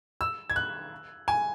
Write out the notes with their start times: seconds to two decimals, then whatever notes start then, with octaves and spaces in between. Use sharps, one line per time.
0.21 E6
0.50 G#6
0.56 F#6
1.28 G#5